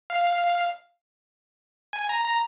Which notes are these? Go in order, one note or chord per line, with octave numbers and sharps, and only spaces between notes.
F5
G#5
A#5
A#5